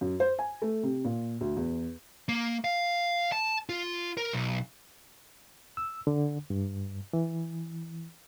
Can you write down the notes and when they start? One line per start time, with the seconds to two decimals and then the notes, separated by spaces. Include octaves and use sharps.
0.01 F#2
0.20 C5
0.39 G#5
0.62 A3
0.83 C3
1.05 A#2
1.41 D2
1.56 E2
2.29 A#3
2.64 F5
3.32 A5
3.69 F4
4.17 A#4
4.33 B1
5.77 E6
6.07 D3
6.50 G2
7.13 E3